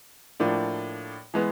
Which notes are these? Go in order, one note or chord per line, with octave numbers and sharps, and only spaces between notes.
A2 F3 A#3 D4
E3 G#3 B3